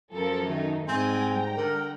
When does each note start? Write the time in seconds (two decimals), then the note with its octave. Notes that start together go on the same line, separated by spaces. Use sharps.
0.14 F#2 F3 A4 A#4
0.46 D#3 A3 D#4
0.88 G#2 G3 C4 G5 G#5 A#5
1.57 D3 A#4